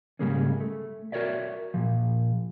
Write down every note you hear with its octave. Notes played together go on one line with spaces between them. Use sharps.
G#2 C#3 G3 G#3 A#3 C#4
A3
F#4 A#4 C#5 D5 E5
A#2 F3